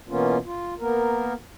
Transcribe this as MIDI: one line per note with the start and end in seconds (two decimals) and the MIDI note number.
0.09 0.38 47
0.09 0.38 52
0.09 0.38 58
0.09 0.38 59
0.09 0.38 61
0.09 0.38 65
0.45 0.74 65
0.79 1.33 58
0.79 1.33 59
0.79 1.33 70